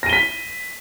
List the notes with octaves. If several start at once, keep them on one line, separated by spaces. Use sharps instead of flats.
A#6 B6 D#7 G7